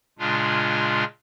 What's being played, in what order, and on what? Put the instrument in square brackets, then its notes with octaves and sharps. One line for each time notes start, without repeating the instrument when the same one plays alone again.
[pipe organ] A#2 C#3 G#3 D4 F4